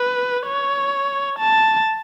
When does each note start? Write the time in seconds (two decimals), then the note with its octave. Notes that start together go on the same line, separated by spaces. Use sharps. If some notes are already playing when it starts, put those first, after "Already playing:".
Already playing: B4
0.47 C#5
1.39 A5